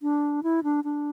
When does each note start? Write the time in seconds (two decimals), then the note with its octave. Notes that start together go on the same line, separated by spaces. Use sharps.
0.02 D4
0.43 E4
0.64 D4
0.84 D4